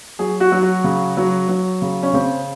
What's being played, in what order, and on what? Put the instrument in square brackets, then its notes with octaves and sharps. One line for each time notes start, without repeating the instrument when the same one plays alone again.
[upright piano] F#3 G#4
F#4
F#3
F#4
C#3
F#3
F#3
C#3
C#4
C#3 C4